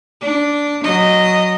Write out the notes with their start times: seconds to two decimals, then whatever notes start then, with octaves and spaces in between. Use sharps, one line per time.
0.21 D4
0.84 F#3 D#5